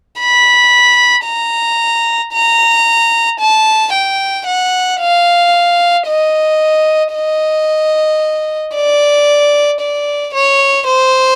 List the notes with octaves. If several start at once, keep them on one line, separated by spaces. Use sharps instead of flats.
B5
A#5
A#5
A5
G5
F#5
F5
D#5
D#5
D5
D5
C#5
C5